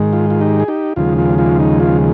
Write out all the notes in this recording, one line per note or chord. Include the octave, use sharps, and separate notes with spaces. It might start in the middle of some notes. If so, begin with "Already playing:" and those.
Already playing: G#2 D#3 G#3
F4
F4
D#4 G4
G#4
D#4 G4
D#2 C#3 F3 G#3 F4
F4
F4
D#4
F4